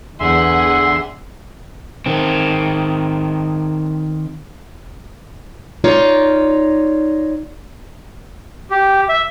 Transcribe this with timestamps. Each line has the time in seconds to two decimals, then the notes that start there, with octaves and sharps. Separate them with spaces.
0.20 E2 D3 G#4 E5 F#5 C6
2.06 D#3 C4
5.84 D#4 F4 C#5 D5
8.71 G4
9.09 E5